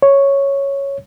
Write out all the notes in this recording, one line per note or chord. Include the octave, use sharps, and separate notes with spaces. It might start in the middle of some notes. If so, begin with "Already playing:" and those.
C#5